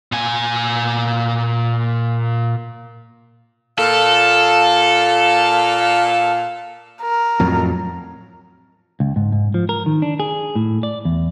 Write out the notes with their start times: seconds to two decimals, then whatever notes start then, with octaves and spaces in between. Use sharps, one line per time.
0.12 A#2 G#5
3.78 A#2 A4 F5
7.02 A#4
7.40 F2 A2 F#3
9.00 C#2
9.16 G#2
9.32 G#2
9.54 F3
9.69 A#4
9.86 D#3
10.02 D4
10.20 G#4
10.55 A2
10.83 D5
11.05 E2